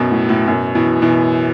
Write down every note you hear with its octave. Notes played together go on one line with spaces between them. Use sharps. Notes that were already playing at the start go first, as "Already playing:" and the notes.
Already playing: F#2 B2
A2
A2
F#2 B2
B2 E3
B2 E3